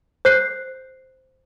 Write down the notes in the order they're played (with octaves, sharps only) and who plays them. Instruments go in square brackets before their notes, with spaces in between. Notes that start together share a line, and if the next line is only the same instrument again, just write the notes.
[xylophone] C5 F#6 C7